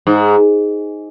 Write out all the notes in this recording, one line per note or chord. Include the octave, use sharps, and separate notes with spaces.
G#2